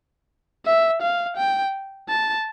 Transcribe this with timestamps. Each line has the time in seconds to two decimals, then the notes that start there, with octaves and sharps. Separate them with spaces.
0.66 E5
1.02 F5
1.37 G5
2.09 A5